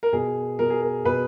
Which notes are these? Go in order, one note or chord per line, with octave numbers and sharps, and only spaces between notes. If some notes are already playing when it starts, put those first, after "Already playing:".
A#4
B2 G#4
B2 A#4
G#4
A#4
B2 B4